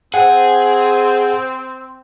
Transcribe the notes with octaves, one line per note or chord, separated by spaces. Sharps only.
C4 G#4 F#5 G5